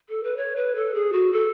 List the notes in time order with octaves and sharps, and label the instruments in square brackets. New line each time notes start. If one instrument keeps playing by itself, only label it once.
[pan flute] A4
B4
C#5
B4
A4
G#4
F#4
A4